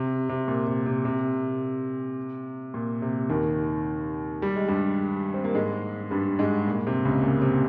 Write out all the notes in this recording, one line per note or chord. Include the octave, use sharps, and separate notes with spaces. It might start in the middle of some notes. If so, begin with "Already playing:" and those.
Already playing: C3
C3
A#2
C3
C3
C3
A#2
C3
D#2 D#3
G3
G#3
G2 G3
C4
A#3
G#2 G#3
G2 G3
G#2 G#3
A#2
C3
C#2 C#3
A#2
C3